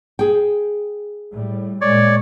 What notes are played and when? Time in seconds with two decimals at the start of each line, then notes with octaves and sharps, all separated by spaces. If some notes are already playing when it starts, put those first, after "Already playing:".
0.19 G#4 G5
1.31 A2 G3
1.81 A#2 G#3 C#5 D5